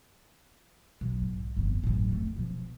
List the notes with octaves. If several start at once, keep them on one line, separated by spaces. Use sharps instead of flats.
B1
G#2
G1 F2
A1 F#2
F2 A3
B2 F3